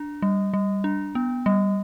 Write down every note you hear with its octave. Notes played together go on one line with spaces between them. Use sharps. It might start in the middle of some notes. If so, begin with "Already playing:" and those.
Already playing: D4
G3
G3
D4
B3
G3